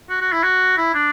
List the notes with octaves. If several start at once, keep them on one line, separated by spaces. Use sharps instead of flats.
F#4
F#4
E4
F#4
E4
D4